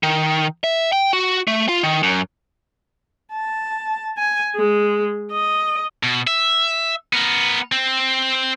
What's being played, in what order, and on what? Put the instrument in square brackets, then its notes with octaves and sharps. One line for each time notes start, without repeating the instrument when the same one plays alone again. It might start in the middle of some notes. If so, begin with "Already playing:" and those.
[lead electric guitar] D#3
E5
G5
F#4
A3
F4
D#3
F#2
[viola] A5
G#5
G#3
D#5
[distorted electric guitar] B2
E5
B3 A#4
C4